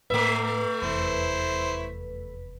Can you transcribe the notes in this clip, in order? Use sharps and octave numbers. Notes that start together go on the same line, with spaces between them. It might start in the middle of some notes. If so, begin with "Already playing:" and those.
A2 A3 B4 E5
F1 E2 E4 C5